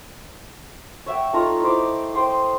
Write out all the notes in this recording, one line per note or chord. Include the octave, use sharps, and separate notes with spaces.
C#5 E5 F#5 G5
A3 D#4 F4 A#5
E4 C5 D6
C5 G5 C6 D#6